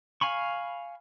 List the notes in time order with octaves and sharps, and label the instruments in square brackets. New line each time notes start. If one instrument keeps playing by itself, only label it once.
[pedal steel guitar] F5 G#5 B5 C#6